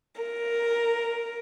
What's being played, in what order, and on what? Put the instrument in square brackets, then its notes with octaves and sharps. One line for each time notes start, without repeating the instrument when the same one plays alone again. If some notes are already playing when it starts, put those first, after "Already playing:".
[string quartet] A#4